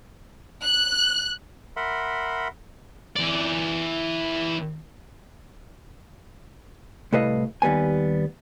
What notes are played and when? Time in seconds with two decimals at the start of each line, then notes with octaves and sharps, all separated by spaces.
0.62 F#6
1.76 A#4 E5 F#5 B5 C6
3.16 E3 D5
7.13 C2 A2 A4 B4 D#5 F5
7.62 D#2 G3 B3 G#5